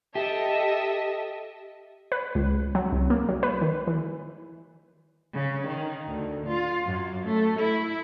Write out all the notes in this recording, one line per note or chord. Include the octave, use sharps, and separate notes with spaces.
G4 A4 D#5 E5
B4
C#2
F#3
C2
A#3
F#3
B4
D#3
E3
C#3
D#3
D2
F4
F#2
A3
E4